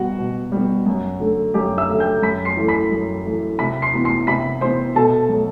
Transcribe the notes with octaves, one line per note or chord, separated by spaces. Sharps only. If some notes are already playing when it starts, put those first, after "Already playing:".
Already playing: B2 G3 B3 F#4 F#5
B2
G3 B3
F#2
D3 A3
F#2 G4 G5
E5 E6
D3 A3
G5 G6
F#2 B5 B6
C6 C7
E3 A3
B5 B6
F#2
E3 A3
C3 B5 B6
C6 C7
E3 B3
C6 C7
C3 B5 B6
E3 B3 C5 C6
B2 A4 A5
F#3 A3